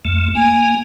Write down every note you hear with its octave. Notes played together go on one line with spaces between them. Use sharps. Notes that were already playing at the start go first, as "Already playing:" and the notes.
F2 A3
A#3 G#5